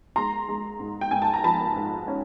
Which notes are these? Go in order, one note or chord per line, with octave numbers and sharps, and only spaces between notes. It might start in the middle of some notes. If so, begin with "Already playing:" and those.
G#3 A#5 C6
G#3
G#2
G5
G#2 G#5
A5
A#5
F3 A5 B5
G#2
C#4